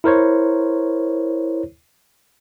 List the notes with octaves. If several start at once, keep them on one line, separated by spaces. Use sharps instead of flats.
E4 A#4 C5 C#5